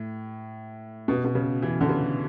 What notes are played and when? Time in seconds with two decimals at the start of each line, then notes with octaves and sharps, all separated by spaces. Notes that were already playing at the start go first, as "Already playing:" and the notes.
Already playing: A2
1.08 B2
1.24 B2
1.35 C#3
1.62 E3
1.81 D3
1.89 C#3